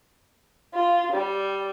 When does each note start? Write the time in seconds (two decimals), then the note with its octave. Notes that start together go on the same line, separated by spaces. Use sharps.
0.73 F4
1.11 G3